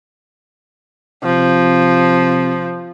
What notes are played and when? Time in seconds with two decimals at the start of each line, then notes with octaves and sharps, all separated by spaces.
1.24 C3 F3